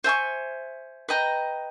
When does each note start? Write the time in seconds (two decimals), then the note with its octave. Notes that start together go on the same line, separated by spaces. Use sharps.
0.04 C5 E5 G#5 C#6
1.09 B4 D#5 G5 A#5